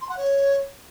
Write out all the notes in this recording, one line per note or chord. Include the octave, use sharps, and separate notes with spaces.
C6
F#5
C#5